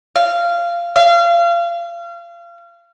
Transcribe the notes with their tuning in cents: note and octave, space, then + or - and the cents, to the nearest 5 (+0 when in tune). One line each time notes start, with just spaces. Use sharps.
F5 -15
F5 -30